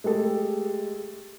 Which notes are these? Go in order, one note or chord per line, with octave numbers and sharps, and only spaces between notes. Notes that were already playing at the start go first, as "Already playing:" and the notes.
G#3 A3 G4 A4